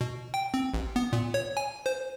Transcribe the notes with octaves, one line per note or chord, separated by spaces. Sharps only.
B2
G5
C4
A1
B3
A#2
C#5
G#5
C5